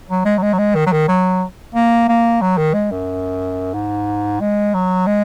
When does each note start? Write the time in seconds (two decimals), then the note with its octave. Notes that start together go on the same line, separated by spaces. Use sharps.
0.09 F#3
0.25 G#3
0.38 F#3
0.42 G#3
0.53 F#3
0.58 G#3
0.75 D#3
0.86 F#3
0.92 D#3
1.08 F#3
1.75 A#3
2.08 A#3
2.41 F#3
2.57 D#3
2.74 G#3
2.91 F#2
3.74 G#2
4.40 G#3
4.73 F#3
5.06 G#3